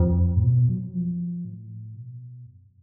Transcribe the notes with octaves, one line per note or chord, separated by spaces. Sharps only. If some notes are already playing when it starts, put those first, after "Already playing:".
Already playing: F2
A2
B2
F#3
F3
A2
B2
F#2